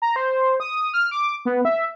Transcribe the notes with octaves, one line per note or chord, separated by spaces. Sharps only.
A#5
C5
D#6
F6
D6
B3
E5